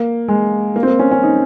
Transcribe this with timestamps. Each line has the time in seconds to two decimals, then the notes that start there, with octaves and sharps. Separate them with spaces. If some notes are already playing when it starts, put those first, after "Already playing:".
Already playing: A#3
0.28 G#3
0.76 A#3
0.83 C4
0.88 A#3
0.99 C#4
1.11 C#4
1.23 D#4